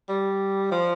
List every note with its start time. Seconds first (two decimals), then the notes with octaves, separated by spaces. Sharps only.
0.09 G3
0.72 F3